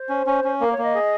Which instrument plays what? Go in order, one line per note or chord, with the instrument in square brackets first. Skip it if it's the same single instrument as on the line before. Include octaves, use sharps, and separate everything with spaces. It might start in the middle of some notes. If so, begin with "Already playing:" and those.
Already playing: [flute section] C5
[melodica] C#4
C#4
C#4
[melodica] A#3 [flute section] A#4
[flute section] C#5
[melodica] A#3
[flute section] D#5
[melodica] G#4